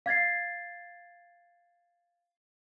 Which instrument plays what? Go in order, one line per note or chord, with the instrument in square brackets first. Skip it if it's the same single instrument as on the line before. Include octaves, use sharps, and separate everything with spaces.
[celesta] F5 G#6 A6 C7